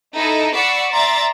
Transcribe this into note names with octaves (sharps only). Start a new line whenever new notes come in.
D#4 E4 A4
D5 F#5 B5 C#6 E6 C7
D5 E5 A#5 C6 A6